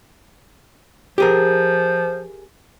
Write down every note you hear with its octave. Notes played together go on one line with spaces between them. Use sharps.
F3 G4 G#4 A#4